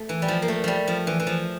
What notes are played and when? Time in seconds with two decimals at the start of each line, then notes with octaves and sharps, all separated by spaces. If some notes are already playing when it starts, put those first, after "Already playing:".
Already playing: A3
0.09 E3
0.22 G3
0.28 F3
0.42 A#3
0.48 A3
0.64 F3 G3
0.87 F3
1.07 E3
1.20 E3
1.27 F3